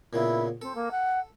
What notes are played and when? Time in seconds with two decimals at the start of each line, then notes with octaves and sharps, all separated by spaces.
0.13 A#2 C#3 B3 E4
0.62 C4 A4
0.75 A#3
0.91 F#5